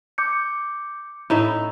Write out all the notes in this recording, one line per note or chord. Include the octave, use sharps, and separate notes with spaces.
D6 G6 C#7
A2 D#4 E5 B5